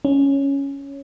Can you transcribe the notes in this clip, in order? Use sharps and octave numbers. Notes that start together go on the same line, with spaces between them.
C#4